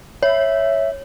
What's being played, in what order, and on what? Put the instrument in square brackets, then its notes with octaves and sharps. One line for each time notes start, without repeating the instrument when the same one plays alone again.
[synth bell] C#5 [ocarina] E5